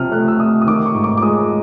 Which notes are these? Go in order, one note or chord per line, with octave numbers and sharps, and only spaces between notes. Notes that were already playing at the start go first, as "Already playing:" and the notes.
Already playing: C3 F3 D#6 F6
A3 F#6
E6
C3 D#6
D#6
D#3 D6
C#6
G#2
D6
D6
G#3 D#6